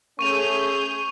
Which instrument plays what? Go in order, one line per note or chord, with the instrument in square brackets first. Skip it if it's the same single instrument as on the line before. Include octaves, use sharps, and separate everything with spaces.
[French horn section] A3 C#4 [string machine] G#4 G6 [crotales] C#6 D#7 F7